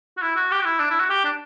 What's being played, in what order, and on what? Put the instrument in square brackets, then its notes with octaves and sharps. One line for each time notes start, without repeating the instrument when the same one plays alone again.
[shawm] F#4
E4
F#4
G4
F#4
E4
D4
E4
F#4
G4
D4